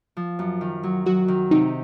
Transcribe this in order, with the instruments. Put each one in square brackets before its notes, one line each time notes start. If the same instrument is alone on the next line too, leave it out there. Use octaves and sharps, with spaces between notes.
[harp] F3
F#2
D#3
F#3
[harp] F#3 [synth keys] F#4
[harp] D#3
[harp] C3 [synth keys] D#4